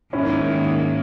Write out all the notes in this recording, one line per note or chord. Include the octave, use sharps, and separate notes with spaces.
G#2 D#3 A#3 C#4 E4